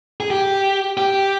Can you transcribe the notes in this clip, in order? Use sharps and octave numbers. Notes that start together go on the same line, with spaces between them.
G#4
G4
G4